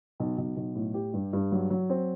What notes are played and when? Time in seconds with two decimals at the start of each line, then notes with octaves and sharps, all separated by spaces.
0.20 B1
0.38 B1
0.57 B1
0.75 A2
0.94 G4
1.14 G2
1.33 G2
1.52 F#3
1.70 F#3
1.90 C4